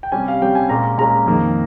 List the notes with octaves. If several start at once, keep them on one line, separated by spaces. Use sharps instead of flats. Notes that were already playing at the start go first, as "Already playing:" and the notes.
G5
C3 G3 C#4 G#5
F5
C3 G3 C#4 G5
G#5
A#2 G#3 C#4 A#5
A#2 G#3 C#4 A#5
F2 D#3 A#3